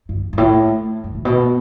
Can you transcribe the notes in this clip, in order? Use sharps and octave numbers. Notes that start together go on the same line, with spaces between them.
G2
G2
A2
G2
A2
B2